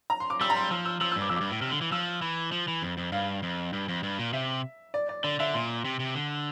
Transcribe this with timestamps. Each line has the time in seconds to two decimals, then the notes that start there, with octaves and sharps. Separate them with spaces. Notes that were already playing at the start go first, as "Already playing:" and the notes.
0.10 A#5
0.20 C6
0.30 D6
0.41 G3 E6
0.50 A#5
0.56 C6
0.71 F3 E6
0.85 E6
1.01 F3 E6
1.12 G2 E6
1.22 D6
1.29 F2 E6
1.36 G2 D6
1.51 A2
1.61 C3 F6
1.71 D3
1.81 E3
1.92 F3 E6
2.22 E3
2.52 F3
2.68 E3
2.82 F2
2.97 F2
3.12 G2 F5
3.43 F2
3.73 G2
3.88 F2
4.03 G2
4.19 A#2
4.33 C3 E5
4.94 D5
5.09 D5
5.24 D3 D5
5.40 D3 E5
5.54 A#2 C6
5.85 C3
6.00 C3
6.15 D3